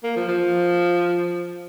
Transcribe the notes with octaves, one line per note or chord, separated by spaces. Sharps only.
A#3
F3
F3